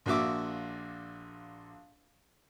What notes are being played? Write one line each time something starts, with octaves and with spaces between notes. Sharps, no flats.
A#1 A#2 F#4 E5 D6